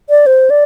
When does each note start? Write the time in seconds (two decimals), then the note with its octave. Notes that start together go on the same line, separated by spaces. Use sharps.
0.09 D5
0.26 C5
0.50 D5